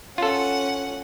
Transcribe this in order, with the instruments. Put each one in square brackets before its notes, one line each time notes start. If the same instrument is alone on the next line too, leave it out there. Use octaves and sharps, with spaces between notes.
[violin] C#4 F#5 [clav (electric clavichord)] F4 A4